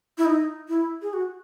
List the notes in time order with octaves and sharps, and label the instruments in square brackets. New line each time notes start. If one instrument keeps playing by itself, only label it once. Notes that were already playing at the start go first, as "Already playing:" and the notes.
[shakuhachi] E4
D#4
E4
G#4
F#4